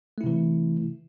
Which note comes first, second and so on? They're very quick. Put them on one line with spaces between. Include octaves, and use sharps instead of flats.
A3 E4 C3 E3